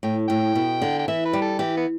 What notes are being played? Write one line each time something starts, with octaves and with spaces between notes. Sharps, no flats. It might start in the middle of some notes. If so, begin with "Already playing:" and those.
A2 G5
A2 G5
B2
D3
G5
E3 E5
B4
G3
A4
E3 G4
B3